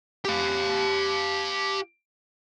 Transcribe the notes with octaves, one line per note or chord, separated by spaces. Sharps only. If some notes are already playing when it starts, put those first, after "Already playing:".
G4 F5